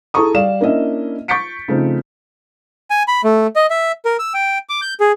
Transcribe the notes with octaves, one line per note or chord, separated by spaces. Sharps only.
E4 G#4 A4 A#5 C#6 D#6
G3 D5 F5 E7
A#3 C#4 D4 E4 D#5 E5
C#6 G6 A6 B6 C#7 D7
C#3 F3 A3 C4 D#4
G#5
B5
A3
D#5
E5
A#4
E6
G5
D6
G6
G#4